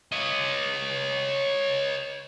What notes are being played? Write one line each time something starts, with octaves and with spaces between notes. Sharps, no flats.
C#5 D#5